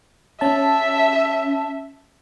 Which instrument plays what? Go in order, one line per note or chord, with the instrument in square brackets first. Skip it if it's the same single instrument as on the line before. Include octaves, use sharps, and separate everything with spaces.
[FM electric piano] C#4 A5 [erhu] E5